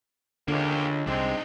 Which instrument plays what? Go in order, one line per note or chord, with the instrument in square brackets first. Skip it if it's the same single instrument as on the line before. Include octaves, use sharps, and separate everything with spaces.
[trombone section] C#2 [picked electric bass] D3 [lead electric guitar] A#3 G4
[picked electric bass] C2 [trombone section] G#3 C4 [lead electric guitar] D4 D#4